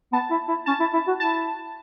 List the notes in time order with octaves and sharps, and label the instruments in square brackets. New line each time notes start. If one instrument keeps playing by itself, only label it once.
[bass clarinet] B3 [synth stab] A5
[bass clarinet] E4
E4
[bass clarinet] C#4 [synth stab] A5
[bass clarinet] E4
E4
F#4
[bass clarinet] E4 [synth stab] A5